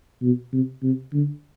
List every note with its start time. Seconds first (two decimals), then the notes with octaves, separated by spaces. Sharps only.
0.22 B2
0.53 C3
0.83 C3
1.13 D3